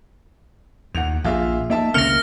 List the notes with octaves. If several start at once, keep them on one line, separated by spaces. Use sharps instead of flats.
D#2 F#5 F7
A#1 F4 G#4 E5
A#3 D#4 E5 A5
C#2 C#3 A#3 C4 F6 A#6 C#7 F7